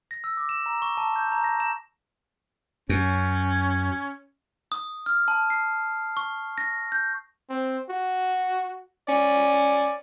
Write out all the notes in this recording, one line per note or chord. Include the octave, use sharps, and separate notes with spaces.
A#6
E6
D6
E7
A#5
C#6
A5
G6
A#5
A#6
E7
F#2 C#4
D#6
F6
A5
C7
C#6
A#6
G6
C4
F#4
C#4 D5